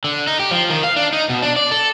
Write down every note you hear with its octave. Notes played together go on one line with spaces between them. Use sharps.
D3
D#4
G4
F3
D#3
F5
D4
D#4
B2
D4
D5
A4